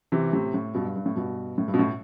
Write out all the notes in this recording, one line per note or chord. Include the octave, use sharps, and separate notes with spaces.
C3 E3
A2 C3
A2
G2 B2
G2
G2
A2
G2 B2
A2
G2
B2
A2